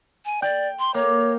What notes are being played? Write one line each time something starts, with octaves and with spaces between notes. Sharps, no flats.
G#5
D5 G5
C6
A#3 C#5